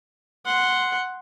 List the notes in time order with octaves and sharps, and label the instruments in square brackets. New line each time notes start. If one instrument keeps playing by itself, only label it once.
[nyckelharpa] F#5 C6